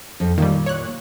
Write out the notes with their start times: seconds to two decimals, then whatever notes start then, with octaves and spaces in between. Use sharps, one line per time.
0.20 F2
0.38 A#2 D#3 G3
0.66 C#5 F#6